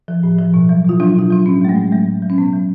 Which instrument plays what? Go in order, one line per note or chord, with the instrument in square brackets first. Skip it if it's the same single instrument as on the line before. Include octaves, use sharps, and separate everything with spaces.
[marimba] F3
A2
F3
B2
F#3
B2 F4
F#3 D4
B2 F4
F#3 D4
A2 C#4
F#3 G#3
A3
A2
F#3 A3
A2
F#3
C#4
B2 B3
F#3